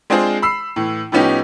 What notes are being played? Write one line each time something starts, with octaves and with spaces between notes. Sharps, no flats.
G#3 C4 D4 F4 G#4 C5
B5 E6 C7
A2 E3
A2 F3 B3 C#4 D#4 G4